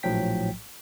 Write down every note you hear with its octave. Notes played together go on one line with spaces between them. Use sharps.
A#1 A2 F3 F#3 G5 B6